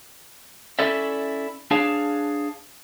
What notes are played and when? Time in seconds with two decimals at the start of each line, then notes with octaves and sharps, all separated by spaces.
0.79 C#4 E4 A4 D5 E5
1.71 D4 G#4 C#5 F5 A5